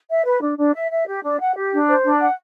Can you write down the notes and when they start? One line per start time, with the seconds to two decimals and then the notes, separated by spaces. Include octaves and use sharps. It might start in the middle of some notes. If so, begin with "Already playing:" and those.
0.09 E5
0.25 B4
0.42 D4
0.58 D4
0.74 E5
0.91 E5
1.07 G4
1.23 D4
1.40 F#5
1.56 G4
1.72 D4
1.89 C5
2.04 D4
2.21 F#5